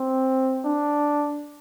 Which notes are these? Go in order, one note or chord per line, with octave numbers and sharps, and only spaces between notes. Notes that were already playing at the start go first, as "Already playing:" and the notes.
Already playing: C4
D4